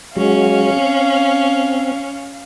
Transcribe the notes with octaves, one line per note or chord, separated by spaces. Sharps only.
F#3 G#3 C#4 F#4 F5
C4